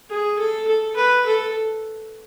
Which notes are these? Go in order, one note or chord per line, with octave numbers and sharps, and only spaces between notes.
G#4
A4
A4
B4
A4